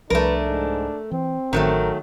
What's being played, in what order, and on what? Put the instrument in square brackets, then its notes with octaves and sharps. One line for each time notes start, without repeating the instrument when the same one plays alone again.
[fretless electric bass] C2 F3 [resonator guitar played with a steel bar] A3 A#4 [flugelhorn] D4 [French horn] B4
[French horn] G#2
[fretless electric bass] E3 [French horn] C4
[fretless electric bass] A1 [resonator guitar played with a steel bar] D#3 F#3 A3 [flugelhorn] A#4